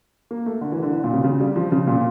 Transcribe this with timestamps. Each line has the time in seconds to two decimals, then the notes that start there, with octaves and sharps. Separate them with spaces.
0.31 A#3
0.46 A3
0.61 D3
0.72 E3
0.83 D3
0.93 D3
1.04 A#2
1.13 C#3
1.24 C#3
1.40 G3
1.56 F3
1.72 C#3
1.87 A#2